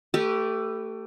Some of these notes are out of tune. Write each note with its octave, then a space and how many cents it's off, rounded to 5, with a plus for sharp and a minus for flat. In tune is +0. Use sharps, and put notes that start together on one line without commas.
A3 +20 G4 -10 B4 +0